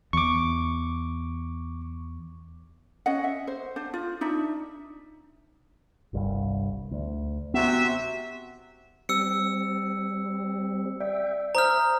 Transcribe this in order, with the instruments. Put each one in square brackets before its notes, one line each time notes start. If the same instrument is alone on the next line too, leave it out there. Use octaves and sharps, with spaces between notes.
[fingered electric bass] E2 [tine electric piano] C#6 D6
[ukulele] C#4 D#5 F#5
E5
C5
D4 C5
F4
D4 D#4 E5
[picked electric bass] G1 C2 G2
D2
[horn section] C3 F#4 E5 [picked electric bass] B3
[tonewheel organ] G3 C4 [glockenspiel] E6 C#7
[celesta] D5 [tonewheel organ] E5 G5
[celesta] C5 D#6 G6 [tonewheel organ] E5 [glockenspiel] A#5 F6